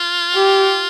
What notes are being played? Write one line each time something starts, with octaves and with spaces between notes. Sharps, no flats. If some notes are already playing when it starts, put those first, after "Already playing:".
Already playing: F4
G4